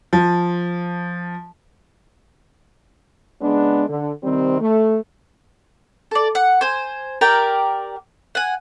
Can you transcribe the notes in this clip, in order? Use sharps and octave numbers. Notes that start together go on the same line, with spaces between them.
F3
C#3 G#3 B3 D4
D3
C3 D#3 G3 C4
A3
A4 D5
F#5
C5 G#5
G4 A#4 D5 G5
F#5 G#5